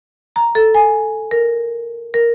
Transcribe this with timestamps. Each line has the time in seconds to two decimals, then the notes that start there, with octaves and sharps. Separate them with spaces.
0.36 A#5
0.55 A4
0.74 G#5
1.31 A#4
2.14 A#4